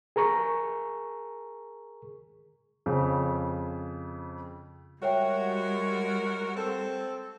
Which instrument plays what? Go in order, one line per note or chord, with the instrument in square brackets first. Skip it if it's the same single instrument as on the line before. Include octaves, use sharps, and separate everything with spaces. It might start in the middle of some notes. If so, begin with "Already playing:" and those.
[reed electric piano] G#4 A#4 A#5 C#6
[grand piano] F2 C#3
[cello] G3 G#3 [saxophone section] F#4 A#4 [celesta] C#5 E5 G5
[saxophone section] C4 A4